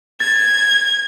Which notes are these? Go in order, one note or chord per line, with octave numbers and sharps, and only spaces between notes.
G#6 A6